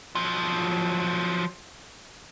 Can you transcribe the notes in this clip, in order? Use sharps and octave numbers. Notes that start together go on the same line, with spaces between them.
F3 F#3